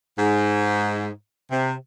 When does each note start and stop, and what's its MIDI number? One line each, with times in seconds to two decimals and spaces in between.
0.18 1.08 44
1.50 1.73 48